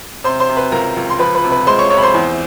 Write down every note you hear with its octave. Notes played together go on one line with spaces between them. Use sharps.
C3 C5 C6
C5 C6
C3
B4 B5
C#2 A#4 A#5
C#2
C6
F3 B4 B5
B4 B5
C3
B4 B5
G#3 C5 C6
C#5 C#6
C3 C#5 C#6
B5
C5 C6
E2